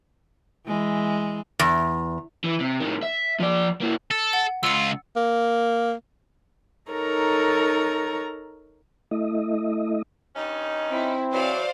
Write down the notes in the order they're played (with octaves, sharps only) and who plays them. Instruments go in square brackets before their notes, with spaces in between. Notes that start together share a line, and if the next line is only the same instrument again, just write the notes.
[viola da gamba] E3 G#3
[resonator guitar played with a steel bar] E2
[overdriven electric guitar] E3
C3
A2 D#3
E5
F3 D5
A#3 E4
[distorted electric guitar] A4
[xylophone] F#5
[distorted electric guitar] C#2 F4 [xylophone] E6 C#7
[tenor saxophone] A#3
[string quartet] D#4 A4 A#4 C#5 A#5
[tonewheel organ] A3 E4 D#5
[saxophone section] G2 C#4 D#4
[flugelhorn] C4 [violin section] E4
[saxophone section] E3 F#3 [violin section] C5 D5 F5